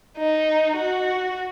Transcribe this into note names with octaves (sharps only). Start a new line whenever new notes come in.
D#4
F#4